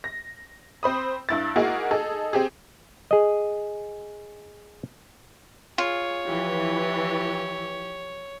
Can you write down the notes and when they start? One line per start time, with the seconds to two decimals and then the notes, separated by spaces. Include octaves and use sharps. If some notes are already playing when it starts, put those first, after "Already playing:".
0.04 A#6
0.83 C4 C5 B5 D#6
1.29 G2 E4 A6
1.56 G#3 A#3 D#4 E4 F#4 G#4
1.91 D#4 G#4 A4
2.33 C4 G4 G#4
3.11 G#4 D#5
5.78 F4 G#4 C#5
6.27 E3 F3 G4